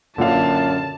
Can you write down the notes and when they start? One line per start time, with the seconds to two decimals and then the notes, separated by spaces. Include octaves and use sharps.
0.18 F#2 A#2 D3 F5 A5